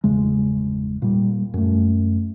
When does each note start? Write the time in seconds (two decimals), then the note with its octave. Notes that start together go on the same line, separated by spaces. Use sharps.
0.04 G1 E2 C#3 G#3
1.02 A#2 G3
1.54 F#2 A3